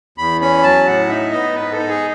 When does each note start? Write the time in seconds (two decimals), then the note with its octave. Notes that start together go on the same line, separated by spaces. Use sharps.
0.18 E2 B5
0.41 C#4 B5
0.63 F#3 A5
0.86 A2 F#5
1.09 D#4 E5
1.31 B3 D#5
1.54 G#2 B4
1.72 A4
1.78 D#4
1.88 G#4